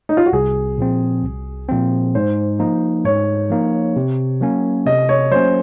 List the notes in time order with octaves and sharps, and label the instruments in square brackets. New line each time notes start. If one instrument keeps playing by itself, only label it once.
[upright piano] D#4
F4
F#4
[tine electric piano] C2 [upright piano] G#4
[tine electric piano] A#2 F3 C4
C2
A#2 F3 C4
[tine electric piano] G#2 [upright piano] C5
[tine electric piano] F3 A#3 D#4
[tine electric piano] G#2 [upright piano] C#5
[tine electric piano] F3 A#3 D#4
C3
F#3 A#3 C#4
[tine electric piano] C3 [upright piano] D#5
[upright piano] C#5
[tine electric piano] F#3 A#3 C#4 [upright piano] C5